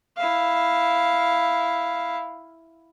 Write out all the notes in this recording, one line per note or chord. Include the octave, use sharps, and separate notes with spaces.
E4 F5